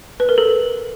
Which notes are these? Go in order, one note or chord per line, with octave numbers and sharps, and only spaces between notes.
B4
A#4
A4